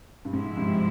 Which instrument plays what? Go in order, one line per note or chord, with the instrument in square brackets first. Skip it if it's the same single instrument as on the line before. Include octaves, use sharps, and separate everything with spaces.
[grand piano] G2
[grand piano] G#2 [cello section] C3 F3 G#3 E4
[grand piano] G2